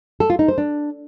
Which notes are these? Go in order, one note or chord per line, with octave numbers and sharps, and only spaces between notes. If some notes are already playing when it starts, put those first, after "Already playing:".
A4
F4
D#4
C5
D4